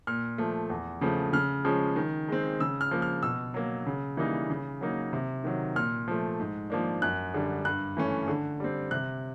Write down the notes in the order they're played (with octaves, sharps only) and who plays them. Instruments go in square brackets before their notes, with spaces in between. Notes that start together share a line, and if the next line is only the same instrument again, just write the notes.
[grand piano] A#2 F6
F3 A3
E2
C#3 F3 A3
C#3 F6
F3 G#3 C#4
D#3
G#3 C4
C#3 E6
F6
F3 A#3
F6
B2 E6
F#3 A#3
C#3
E3 G3 A#3 D#4
C#3
F#3 A#3 D#4
C3
D#3 F#3
A#2 F6
F3 A3
G#2
F3 A#3 D4
F#2 F#6
D3 G3
G2 F#6
E3 A3 C#4
D3
G3 C4
C3 F#6